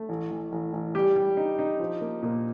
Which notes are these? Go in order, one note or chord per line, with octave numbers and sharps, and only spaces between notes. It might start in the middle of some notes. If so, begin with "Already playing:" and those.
Already playing: A3
A1
A1
A1
A1
G3 G4
G3
D#4
D#4
F3
A#3
A#2